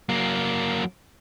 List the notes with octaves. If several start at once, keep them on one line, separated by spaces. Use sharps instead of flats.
F#3 A#3